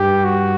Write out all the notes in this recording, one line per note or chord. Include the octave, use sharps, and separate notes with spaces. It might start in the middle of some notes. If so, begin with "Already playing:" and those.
Already playing: G2 G4
F#4